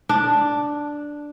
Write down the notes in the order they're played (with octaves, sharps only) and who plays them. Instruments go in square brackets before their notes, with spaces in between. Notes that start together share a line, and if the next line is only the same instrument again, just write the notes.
[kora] D4